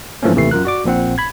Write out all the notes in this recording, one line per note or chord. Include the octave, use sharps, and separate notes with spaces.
G2 E3 F3 A3 A#3 C#4
D#2 C3 E3 A3 C7
F#2 F4 A#4 F#6
F#4 D5 D6
A#1 A#2 C4 F#5
B5 G#6